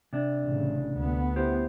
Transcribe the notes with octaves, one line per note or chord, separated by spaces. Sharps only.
C3 D4
A1 C#3
D2 B3
E4 G4 C5